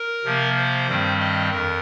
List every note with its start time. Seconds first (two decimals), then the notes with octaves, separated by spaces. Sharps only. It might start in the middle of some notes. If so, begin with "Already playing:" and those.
Already playing: A#4
0.24 C3 F3 A#3
0.56 C5
0.87 G2 D#3 G3 C4
1.19 D#5
1.51 F2 A#4